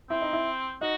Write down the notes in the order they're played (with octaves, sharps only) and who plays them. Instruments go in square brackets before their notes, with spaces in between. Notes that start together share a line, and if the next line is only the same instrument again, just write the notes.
[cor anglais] C4 [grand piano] E4
[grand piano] D#4
E4
[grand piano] D#4 [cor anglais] F#4